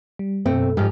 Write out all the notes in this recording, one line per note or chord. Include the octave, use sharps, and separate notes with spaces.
G3
F#2 B2 A3 C4
G#2 F3 G4 F6